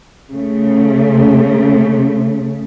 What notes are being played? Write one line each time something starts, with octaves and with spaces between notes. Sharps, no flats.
C#3 A3